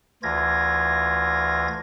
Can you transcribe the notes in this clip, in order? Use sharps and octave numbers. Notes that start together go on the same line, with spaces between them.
D2 E3 F4 G#6 A#6